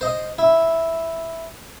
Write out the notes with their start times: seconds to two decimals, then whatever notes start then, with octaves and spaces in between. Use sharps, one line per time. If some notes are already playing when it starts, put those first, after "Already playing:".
0.01 C5 D#5
0.38 E4